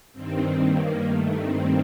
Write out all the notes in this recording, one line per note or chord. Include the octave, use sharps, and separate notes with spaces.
G2 D#3 C4
A#3
G2 D#3 A3
C4